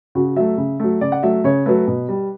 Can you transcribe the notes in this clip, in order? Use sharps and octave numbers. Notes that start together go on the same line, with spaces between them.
C#3 F#4
F#3 A3 E5
C#3
F#3 A3
C#3 D5
F#5
F#3 A3 E5
C#3 C#5
F#3 A3 B4
B2
G3